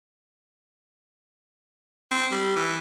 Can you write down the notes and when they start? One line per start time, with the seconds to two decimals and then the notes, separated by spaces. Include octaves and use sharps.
2.11 C4
2.31 G3
2.56 E3